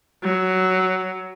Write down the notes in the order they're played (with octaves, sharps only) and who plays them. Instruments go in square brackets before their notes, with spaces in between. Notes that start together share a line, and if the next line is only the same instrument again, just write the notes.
[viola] F#3